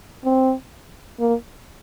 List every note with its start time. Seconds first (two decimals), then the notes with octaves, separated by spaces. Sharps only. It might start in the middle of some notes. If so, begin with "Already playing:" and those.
0.25 C4
1.20 A#3